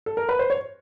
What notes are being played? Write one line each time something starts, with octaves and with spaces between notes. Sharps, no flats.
A4
A#4
B4
C5
C#5